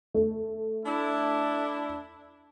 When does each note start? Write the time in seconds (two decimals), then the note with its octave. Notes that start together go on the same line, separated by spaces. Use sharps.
0.14 A3
0.85 D4 E4